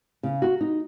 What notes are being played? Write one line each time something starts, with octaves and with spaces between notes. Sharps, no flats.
C#3
F#4
D#4